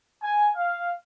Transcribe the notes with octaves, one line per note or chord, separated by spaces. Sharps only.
G#5
F5